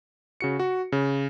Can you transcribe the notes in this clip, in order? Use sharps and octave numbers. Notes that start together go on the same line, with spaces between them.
C#3 F#4 C#7
F#4
C#3